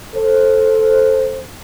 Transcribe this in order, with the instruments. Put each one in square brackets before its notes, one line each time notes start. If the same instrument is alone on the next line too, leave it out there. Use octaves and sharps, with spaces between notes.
[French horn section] A4 C5